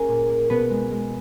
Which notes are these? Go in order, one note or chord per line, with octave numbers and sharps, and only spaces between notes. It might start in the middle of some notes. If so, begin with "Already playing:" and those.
Already playing: A#3 C#4 G#4 A#4
A#2
A#3
B2 B3 B4
G#3
G#3